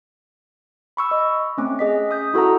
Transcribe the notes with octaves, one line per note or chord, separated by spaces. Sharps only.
B5 C#6 E6
D#5
A3 C4 C#4 D6
G#4 D#5 B6
D#6 G6
E4 F#4 A4 F#5 A#5